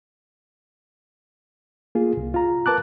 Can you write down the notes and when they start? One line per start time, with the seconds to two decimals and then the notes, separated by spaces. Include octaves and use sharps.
1.95 A#3 F4 G#4
2.17 C2
2.34 F4 A#5
2.66 A#4 B4 A5 D6 F#6